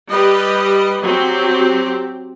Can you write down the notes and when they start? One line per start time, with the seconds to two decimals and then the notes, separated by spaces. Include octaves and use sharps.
0.12 G3 G4 B4 D#5
1.03 F#3 C4 G4